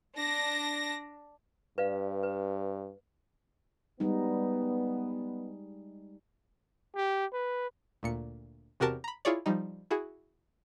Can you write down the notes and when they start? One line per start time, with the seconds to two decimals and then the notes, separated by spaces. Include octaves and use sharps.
0.15 D4 A#6
1.78 G2 B4 D5 F5
2.23 B4
4.00 G3 G#3 B3 D#4
6.96 G4
7.33 B4
8.03 D2 A#2 C#7
8.80 E2 C3 F#4 G4 A#4 A5
9.04 A#5 B5
9.25 E4 F4 G#4 C#5 D5
9.46 F3 G3 D#4
9.91 E4 F#4 G#4